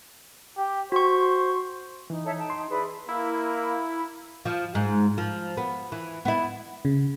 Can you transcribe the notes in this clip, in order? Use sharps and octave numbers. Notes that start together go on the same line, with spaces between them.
G4
F#4 C5 C#6
E3 D#4
A4 C#5 E5
G5 A5
C6
E4 G#4 B4 D5
A#3 E4
F3
G#2
F3
B3
E3
B3 E4
C#3